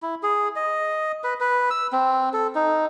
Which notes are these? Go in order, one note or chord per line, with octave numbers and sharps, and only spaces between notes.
E4
G#4
D#5
B4
B4
E6
C4
A4
D#4